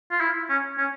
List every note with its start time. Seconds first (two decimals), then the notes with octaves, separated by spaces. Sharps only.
0.11 F4
0.21 E4
0.49 C#4
0.78 C#4